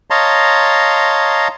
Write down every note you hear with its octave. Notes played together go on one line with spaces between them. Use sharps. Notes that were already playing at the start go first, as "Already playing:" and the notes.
C#5 D#5 F5 A5 A#5 C6